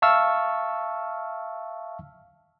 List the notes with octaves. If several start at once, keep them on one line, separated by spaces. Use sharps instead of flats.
E5 F5 A5 C#6 E6 F6